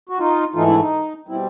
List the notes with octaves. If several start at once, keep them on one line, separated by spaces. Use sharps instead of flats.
F#4
D#4 F4
G#2 E3 A3 D#4 F4
D4 E4
D#4
B2 G3 C4 E4